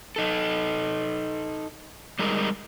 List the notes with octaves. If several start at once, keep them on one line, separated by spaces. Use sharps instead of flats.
D#4 A4
G3 G#3 D#4 A#4